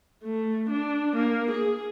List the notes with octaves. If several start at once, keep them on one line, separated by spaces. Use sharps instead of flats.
A3
D4
A#3
G#4